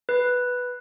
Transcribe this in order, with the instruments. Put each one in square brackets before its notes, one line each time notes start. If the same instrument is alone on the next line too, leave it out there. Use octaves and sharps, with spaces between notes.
[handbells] B4